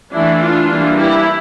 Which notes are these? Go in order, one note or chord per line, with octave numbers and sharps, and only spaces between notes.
E3 A3 D4 E4
D4 F4
E3 G3 A#3 D4
E4 G4